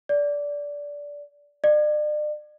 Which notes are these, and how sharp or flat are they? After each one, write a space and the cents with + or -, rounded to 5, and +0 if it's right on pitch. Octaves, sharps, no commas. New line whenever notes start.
D5 -15
D5 +40